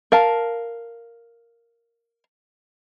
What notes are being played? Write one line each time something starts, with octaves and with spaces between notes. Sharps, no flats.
A#4 F5 A5